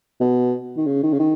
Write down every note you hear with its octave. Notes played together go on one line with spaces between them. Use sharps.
B2
D#3
C#3
D#3
C#3
D#3